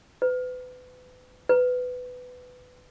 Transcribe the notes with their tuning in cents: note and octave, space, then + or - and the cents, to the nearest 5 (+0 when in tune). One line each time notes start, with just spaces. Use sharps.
B4 +30
B4 +15